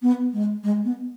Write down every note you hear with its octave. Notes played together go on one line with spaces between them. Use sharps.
B3
G#3
G#3
B3